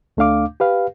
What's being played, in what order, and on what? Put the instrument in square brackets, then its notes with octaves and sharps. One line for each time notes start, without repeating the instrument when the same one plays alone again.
[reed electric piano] D2 A3 D4 F5 D6
G4 B4 F5